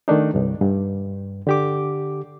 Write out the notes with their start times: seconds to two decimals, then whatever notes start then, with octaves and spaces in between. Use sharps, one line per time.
0.08 D#3 A3 D4 D#4
0.34 C2 G2
0.61 G2
1.47 D3 G4 D6